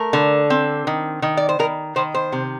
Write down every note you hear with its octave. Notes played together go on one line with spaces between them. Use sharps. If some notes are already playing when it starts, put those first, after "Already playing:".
Already playing: A3 A#4
D3
C4
D#3
D#3
D5
C5
D#3 A#4
D#3 C5
C5
C3